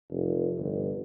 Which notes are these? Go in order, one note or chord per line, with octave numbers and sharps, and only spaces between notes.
F1
G1